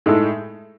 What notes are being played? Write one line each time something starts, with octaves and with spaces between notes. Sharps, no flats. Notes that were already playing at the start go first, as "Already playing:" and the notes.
A2 G#3 D#4 A4